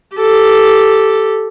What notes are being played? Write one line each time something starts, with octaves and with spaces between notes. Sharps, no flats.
G4 A4